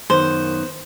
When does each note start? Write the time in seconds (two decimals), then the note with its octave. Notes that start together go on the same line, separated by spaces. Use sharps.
0.10 F#2 D#3 B3 C5